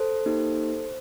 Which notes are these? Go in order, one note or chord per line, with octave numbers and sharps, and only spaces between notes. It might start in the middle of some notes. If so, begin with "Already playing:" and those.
Already playing: A4 C5
A#3 D#4 G4